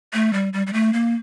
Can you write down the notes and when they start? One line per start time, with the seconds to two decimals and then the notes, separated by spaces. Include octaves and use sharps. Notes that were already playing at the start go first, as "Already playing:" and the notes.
0.13 A3
0.33 G3
0.53 G3
0.67 G3
0.73 A3
0.93 A#3